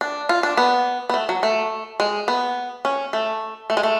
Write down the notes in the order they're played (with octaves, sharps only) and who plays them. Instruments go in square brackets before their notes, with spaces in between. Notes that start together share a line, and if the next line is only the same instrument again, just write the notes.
[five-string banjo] D4
F4
D4
B3
B3
A3
F#3
A3
G#3
B3
C#4
A3
A3
G#3
A3